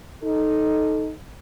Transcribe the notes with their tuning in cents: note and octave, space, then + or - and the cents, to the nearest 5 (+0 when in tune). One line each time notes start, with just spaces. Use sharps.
D#4 +0 A4 -10